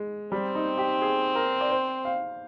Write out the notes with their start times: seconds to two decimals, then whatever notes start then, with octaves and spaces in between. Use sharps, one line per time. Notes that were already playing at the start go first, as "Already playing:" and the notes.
Already playing: G#3
0.32 G3 C4
0.55 D#4
0.78 G4
1.02 G#4
1.35 A#4
1.61 D5
1.70 C5
2.05 F5